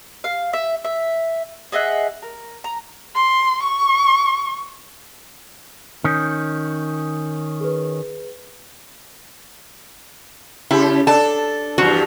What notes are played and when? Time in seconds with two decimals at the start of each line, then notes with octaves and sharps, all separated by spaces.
0.24 F5
0.53 E5
0.85 E5
1.72 G#4 D#5 E5 F#5
2.22 A#4
2.64 A#5
3.15 C6
3.63 C#6
6.04 D#3 C#4 D#6 G6
7.60 G#4 B4
10.71 C#3 E4 G4
11.07 D4 A4 A5
11.78 E2 G2 F3 F#4